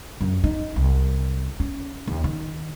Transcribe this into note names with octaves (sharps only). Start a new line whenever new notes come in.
F#2
D#4
C2
C#4
D#2
D#3